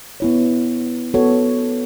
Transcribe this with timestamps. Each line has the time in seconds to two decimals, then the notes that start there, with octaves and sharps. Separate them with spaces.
0.20 B3 E4 C#5
1.14 B3 F#4 A4 C#5